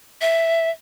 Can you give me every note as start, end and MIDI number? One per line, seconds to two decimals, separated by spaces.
0.21 0.70 76